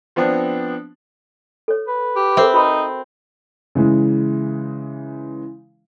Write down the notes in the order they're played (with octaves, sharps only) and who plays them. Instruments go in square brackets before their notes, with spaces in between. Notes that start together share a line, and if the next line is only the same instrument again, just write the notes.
[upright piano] F3 B3 C4 D4
[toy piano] A4 C#5
[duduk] B4
[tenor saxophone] G4
[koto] C4 [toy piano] A4 A#4 E5
[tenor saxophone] D#4 [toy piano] F#4 B5 C6
[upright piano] C#3 E3 G#3